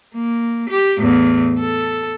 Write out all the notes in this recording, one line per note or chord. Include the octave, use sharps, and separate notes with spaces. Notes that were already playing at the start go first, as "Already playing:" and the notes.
A#3
G4
E2 A2
A4